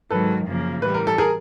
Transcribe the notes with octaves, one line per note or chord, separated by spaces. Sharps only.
G#2 D#3 F#3 A4 B4
F#2 C#3 F3 A#3
A2 E3 G3 B4
A#4
A4
G#4 A#4